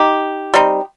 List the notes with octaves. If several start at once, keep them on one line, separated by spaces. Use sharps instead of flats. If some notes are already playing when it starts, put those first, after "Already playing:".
Already playing: D#4 G4
G3 C4 D#4